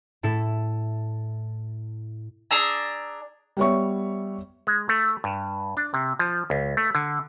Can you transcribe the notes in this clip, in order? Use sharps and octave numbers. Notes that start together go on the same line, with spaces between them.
A2 E4 A4 B6
D4 G#4 A#5 E6
G3 B3 C#5 E5 C#6
G#3
A3
G2
D4
C3
F3
C#2
A3
D3